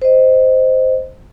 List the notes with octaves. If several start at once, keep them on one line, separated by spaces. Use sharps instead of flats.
C5 D#5